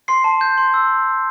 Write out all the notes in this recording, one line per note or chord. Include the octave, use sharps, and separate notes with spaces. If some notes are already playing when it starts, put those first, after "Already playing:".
C6 C7
A5
G6
C6
E6